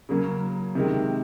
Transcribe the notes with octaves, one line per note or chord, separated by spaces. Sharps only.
C#3 F#3 A#3 C#4
C3 D#3 G#3